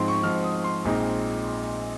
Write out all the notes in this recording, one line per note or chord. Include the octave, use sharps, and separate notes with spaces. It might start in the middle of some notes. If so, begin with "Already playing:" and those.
Already playing: G#2 F3 C4 C6
C#6
G#2 F3 C4 F6
D#6
C6
A#1 A#2 G#3 C4 D#4